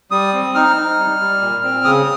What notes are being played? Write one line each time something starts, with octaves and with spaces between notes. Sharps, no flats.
G3 D#6
C4
D#4 F6
D#4
G3
G3
A#2
C4
C#3 D#6